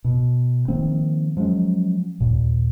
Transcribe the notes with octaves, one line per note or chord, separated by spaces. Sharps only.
B2
D#3 F3 A#3 C4
F3 F#3 G#3 C#4
D#2 A#2